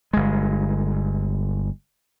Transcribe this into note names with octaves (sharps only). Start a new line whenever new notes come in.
G1 G#3